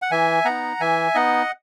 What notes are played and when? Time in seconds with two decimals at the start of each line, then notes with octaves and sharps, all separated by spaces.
0.02 F#5
0.11 E3 E5 G#5
0.45 B3 D#4 F#5 A#5
0.80 E3 E5 G#5
1.15 B3 D#4 D#5 F#5